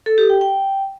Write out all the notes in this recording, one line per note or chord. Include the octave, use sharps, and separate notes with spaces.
A4
G4
G5
G5